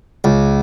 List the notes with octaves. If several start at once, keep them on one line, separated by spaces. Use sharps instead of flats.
C#2